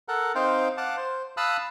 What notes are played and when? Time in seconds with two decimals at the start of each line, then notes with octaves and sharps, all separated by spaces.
0.08 A4 A#4 F#5
0.35 C4 D#4 C5 F5 G5
0.77 F5 F#5 A5 D6
0.97 C5
1.37 F5 A5 B5 D#6 E6 F#6